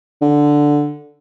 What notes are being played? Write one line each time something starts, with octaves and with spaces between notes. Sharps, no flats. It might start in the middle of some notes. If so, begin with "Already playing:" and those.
D3